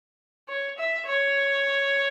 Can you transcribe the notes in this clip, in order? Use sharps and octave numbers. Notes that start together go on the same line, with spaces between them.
C#5
E5
C#5